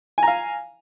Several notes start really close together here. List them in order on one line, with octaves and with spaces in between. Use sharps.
G#5 A#5 F5